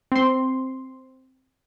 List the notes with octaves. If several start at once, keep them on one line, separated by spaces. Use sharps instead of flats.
C4 C6